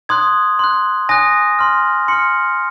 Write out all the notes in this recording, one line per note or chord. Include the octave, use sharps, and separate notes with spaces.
C6 D#6 F#6 G#6
C6 F#6
G#5 D#6 F#6 A#6
C6 F6
C6 F6 C#7